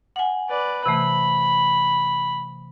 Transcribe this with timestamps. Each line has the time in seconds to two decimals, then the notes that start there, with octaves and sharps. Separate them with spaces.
0.16 F#5 G#5
0.49 B4 D5
0.86 C3 E3 A3 B5